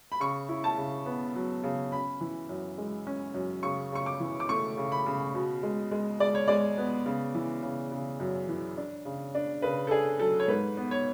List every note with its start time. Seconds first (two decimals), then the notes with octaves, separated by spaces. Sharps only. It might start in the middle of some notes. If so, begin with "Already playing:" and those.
0.12 B5
0.20 C#3 C#6
0.49 E4
0.64 A5
0.78 C#3
1.06 B3
1.36 F#3
1.64 C#3
1.92 C#4 B5
2.21 E3
2.49 F#2
2.78 G#3
3.07 C#4
3.34 F#2
3.63 C#3 C#6
3.92 C#3 C#6
4.06 D6
4.20 E3
4.40 D6
4.49 A3 C#6
4.78 C#3
4.92 B5
5.06 C#3
5.35 B2
5.63 G#3
5.91 G#3
6.20 G#3 D5
6.35 C#5
6.48 G#3 D5
6.78 B3
7.06 C#3
7.35 E3
7.63 C#3
7.92 C#3
8.20 F#2
8.49 E3
8.77 D4
9.05 C#3
9.35 D4
9.62 C#3 B4
9.87 A4
9.91 D4 G#4
10.20 F#3 A4
10.40 C#5
10.48 G#2 B4
10.77 B3
10.91 C#5